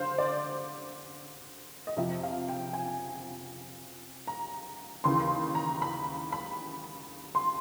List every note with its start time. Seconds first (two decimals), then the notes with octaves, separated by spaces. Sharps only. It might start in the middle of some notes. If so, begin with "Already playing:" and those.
Already playing: D3 C5 F5
0.18 D5
1.87 D#5
1.97 F2 C3 F3 E5
2.23 F5
2.49 G5
2.73 G#5
4.27 A#5
5.04 D#2 C#3 E3 C6
5.55 A#5
5.82 B5
6.32 B5
7.35 C6